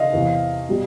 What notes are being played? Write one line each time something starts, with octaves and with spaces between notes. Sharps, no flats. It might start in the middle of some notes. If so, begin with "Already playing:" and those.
Already playing: D#5 F5
E2 C3 E3
B2 G3